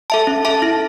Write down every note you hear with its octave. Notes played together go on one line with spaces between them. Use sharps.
A4 E5 A5
C#4
A4 E5 A5
E4